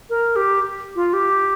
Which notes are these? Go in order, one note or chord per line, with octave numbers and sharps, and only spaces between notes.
A#4
G4
F4
G4